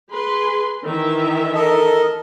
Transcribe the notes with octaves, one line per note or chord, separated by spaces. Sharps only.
G#4 B4 C6
D#3 E3 E5
A4 A#4 D#5